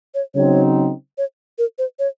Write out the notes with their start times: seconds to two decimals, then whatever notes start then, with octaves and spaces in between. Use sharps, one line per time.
0.14 C#5
0.34 C#3 F#3 C4 D#4 C#5
1.18 C#5
1.58 A#4
1.78 C5
1.99 C#5